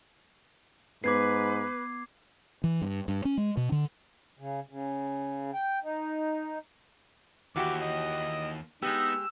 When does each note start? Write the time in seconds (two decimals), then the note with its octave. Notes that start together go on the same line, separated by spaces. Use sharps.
1.04 G#2 B3 B4 D6 G#6 C7
2.64 E3
2.82 G2
3.08 G2
3.25 C#4
3.37 G#3
3.57 B2
3.72 D3
4.39 C#3
4.69 C#3
5.54 G5
5.83 D#4
7.56 D#2 E3 F#4 G4 D6
7.81 D#5
8.82 G#3 B3 D#4 G4 E6